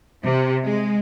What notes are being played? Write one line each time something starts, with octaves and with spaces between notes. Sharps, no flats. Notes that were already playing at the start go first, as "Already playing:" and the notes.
C3
G#3